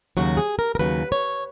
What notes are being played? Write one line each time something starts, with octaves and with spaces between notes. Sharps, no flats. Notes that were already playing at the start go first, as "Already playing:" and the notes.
D#2 C#3 F#3 F#4
G#4
A#4
A#4
D#2 C#3 F#3 B4
C#5